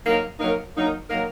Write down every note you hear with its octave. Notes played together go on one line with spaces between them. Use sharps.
F#3 A#3 D#4 A#4
F#3 A#3 D#4 A#4
F#3 A#3 D#4 A#4
F#3 A#3 D#4 A#4